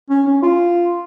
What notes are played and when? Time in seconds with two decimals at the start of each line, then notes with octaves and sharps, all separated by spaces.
0.10 C#4
0.27 C#4
0.43 F4